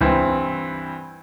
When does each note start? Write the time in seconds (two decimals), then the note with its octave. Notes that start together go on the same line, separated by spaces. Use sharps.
0.01 C#2 G2 E3 C4